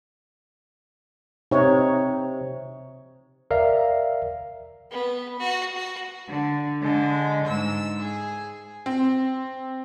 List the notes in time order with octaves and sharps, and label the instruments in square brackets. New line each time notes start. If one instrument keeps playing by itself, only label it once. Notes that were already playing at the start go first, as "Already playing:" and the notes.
[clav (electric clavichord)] C3 [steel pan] D#4 C#5
[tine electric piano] A#4 D5 E5 F5
[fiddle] B3
F#4
F#4
[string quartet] D3
D3 G#3
G#2 E6
G#4
[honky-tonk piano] C4